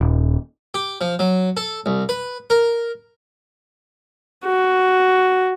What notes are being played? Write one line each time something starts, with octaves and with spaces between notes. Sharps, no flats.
D#1
G4
F3
F#3
A4
C2
B4
A#4
F#4